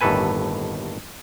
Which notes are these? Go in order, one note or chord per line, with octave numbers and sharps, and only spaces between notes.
G1 D#2 A2 A4 B4 G#5